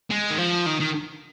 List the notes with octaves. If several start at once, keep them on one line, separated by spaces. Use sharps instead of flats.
G#3
D#3
F3
D#3
D#3